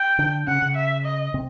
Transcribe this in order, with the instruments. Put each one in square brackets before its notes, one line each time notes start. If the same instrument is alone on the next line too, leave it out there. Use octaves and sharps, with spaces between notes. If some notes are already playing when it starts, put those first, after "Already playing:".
Already playing: [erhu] G5
[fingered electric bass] D3 D4
[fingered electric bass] C#3 C#4 [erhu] F#5
[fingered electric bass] C#3 C#4
[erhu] E5
D#5
[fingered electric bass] C3 C4